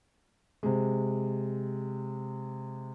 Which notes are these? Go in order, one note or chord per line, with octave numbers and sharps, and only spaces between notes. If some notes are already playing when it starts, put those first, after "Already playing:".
C3 G#3